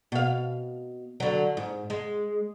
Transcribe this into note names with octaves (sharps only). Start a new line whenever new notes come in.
B2 F5
D3 F#3
G#2
G#3